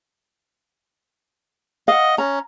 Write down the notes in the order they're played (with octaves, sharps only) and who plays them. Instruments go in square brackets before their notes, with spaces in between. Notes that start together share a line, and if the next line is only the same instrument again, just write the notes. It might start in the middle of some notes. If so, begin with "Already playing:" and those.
[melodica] D#5 [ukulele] F5 F#5
[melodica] C#4 [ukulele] A#5